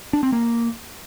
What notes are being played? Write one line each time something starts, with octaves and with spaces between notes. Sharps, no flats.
D4
C4
A#3